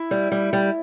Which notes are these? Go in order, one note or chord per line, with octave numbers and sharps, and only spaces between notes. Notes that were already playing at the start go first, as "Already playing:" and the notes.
Already playing: E4
G3
G3
G3